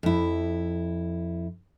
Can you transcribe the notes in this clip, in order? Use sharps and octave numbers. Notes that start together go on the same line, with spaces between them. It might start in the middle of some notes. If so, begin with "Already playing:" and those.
F2 E4